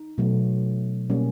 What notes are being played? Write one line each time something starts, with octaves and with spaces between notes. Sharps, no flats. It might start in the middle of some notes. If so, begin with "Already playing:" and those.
Already playing: D#4
B2 F#3 A3
B2 G3 A#3 C#4